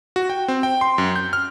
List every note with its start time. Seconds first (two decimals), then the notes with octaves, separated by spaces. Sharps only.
0.16 F#4
0.30 G5
0.48 C4
0.63 G5
0.81 C6
0.98 F#2
1.16 G6
1.33 F6